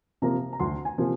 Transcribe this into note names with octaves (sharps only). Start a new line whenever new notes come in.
C3 F3 A#3 A#5
A#5
D2 C6
G#5
C3 F3 A#3